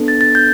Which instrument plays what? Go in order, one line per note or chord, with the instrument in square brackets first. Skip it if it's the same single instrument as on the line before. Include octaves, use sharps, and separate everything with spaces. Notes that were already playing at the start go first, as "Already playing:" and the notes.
Already playing: [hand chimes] B3 D4 A4
A6
A6
G6